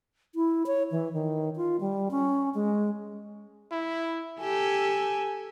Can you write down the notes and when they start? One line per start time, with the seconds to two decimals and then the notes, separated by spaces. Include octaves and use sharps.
0.35 E4
0.67 C#5
0.91 E3
1.13 D#3
1.56 F4
1.80 G3
2.11 C#4
2.54 G#3
3.72 E4
4.40 G4 A4 G#5